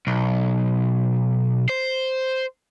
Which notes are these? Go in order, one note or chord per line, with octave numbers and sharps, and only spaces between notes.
B1
C5